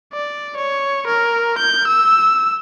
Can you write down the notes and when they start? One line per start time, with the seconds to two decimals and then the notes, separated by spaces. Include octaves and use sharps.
0.13 D5
0.57 C#5
1.07 A#4
1.58 G6
1.87 E6